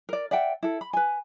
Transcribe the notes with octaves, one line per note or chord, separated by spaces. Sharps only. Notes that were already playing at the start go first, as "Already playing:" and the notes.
A#4 D5
D5 E5 F#5 G5
E4 A4
B5
B4 G#5